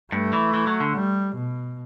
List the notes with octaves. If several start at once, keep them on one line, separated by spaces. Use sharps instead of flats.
G2 A3
E3
E3
F#3
D3
G3
B2